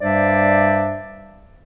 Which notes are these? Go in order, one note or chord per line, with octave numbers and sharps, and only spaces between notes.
G2 G3 D4 C5 D5 E5